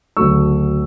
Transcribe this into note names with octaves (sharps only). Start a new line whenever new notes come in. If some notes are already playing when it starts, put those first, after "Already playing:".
D2 C#3 F#3 A3 C#6 E6